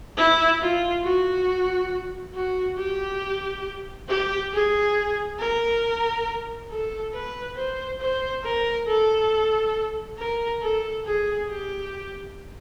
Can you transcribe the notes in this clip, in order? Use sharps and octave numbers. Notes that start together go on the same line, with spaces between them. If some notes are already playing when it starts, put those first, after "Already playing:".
E4
F4
F#4
F#4
G4
G4
G#4
A#4
A4
B4
C5
C5
A#4
A4
A#4
A4
G#4
G4